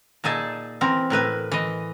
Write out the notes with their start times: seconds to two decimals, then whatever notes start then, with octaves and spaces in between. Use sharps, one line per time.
0.24 A#2 D#4 G#4 E5 A5
0.81 E3 C4 A#4
1.10 A2 A#4 B4 E5
1.52 E3 D#5